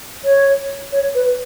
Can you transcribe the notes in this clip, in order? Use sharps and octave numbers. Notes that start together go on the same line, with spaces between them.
C#5
C#5
B4